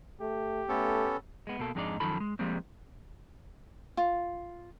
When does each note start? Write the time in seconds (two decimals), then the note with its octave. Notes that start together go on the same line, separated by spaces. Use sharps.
0.21 A3 G4
0.69 A3 B3 C#4 A4
1.47 G#3 B3
1.59 B2 A#3 A4
1.75 F2 G#2 G#3 D4 D#4 D5
2.00 F#2 D#3 F3 A4 B5
2.20 G#3
2.39 F3 G3 G#3 A#3 C4
3.97 F4